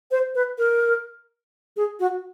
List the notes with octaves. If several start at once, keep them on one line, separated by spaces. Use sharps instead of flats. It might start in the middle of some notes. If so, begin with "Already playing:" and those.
C5
B4
A#4
G#4
F#4